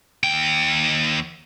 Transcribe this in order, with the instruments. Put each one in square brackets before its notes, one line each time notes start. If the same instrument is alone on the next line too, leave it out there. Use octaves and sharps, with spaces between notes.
[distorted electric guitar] D#2 G5